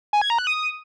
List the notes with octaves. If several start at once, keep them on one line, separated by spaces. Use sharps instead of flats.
G#5
G#6
A#5
F#6
D#6